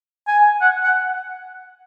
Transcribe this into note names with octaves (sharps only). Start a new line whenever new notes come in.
G#5
F#5
F#5